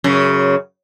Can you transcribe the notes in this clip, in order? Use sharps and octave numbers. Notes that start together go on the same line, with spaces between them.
F#2 C#3